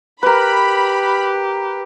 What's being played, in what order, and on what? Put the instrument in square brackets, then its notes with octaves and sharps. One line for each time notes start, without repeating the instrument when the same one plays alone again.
[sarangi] G4 [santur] A#4 B4 [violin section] B5